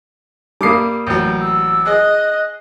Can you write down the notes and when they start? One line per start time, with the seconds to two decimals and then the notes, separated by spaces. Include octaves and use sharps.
0.61 G3 A#3 D6 D#6 C7
1.07 A1 F#3 G6
1.41 E6
1.86 G#4 D#5 F#6